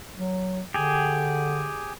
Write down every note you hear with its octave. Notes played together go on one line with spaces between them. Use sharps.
F#3
D3 G4 G#4